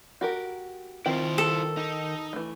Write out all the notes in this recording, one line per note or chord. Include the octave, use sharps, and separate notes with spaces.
F#4 G4 A#4
D#3 C4 E4 F4 C5 G5
A4
D#4 G4
E3 A3